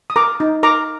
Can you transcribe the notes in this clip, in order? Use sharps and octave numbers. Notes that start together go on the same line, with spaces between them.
D#6
A#4 A#5 D6
D#4
A#4 A#5 D6